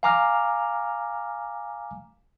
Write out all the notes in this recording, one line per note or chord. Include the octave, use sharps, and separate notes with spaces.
F5 G#5 A#5 D6 F6